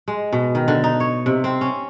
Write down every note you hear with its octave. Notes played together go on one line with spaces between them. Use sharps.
G#3
B2
D#3
D3
D#4
C#5
C3
C4
C#4